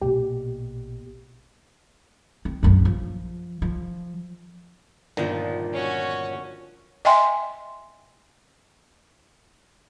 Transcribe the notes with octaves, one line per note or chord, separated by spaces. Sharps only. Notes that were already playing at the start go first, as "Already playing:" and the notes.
A#1 B2 G4
C4
A#1 F#2
F3
F3
G1 A#2 D#3 F3 D4 D#4
C#4 F#4 C#5
D#5 E5 G5 G#5 C6